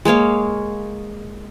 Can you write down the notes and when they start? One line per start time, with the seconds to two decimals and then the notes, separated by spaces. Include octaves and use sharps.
0.05 G#3 A#3 C#5 F5